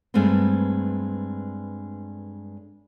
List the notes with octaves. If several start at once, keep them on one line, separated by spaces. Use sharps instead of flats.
G2 G#3 A3 B3 C4